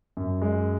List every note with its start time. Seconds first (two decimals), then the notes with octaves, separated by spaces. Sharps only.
0.17 F#2
0.41 G#3